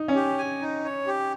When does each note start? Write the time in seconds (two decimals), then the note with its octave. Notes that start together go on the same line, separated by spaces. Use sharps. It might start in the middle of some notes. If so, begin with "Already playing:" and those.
Already playing: D#4
0.08 C#4
0.15 G4
0.38 G#5
0.61 D#4
0.84 C#5
1.07 G4